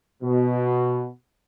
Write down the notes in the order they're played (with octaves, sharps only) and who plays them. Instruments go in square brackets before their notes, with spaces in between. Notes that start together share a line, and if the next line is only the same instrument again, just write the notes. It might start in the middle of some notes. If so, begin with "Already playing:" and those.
[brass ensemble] B2